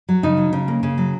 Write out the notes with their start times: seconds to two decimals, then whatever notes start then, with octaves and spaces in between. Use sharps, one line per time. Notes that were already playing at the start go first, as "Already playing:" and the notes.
0.09 F#3
0.23 C#3 D#4
0.37 F#3
0.53 C#3
0.68 A#3
0.83 C#3
0.98 F#3